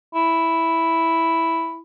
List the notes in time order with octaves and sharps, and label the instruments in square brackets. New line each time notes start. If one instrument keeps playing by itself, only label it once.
[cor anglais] E4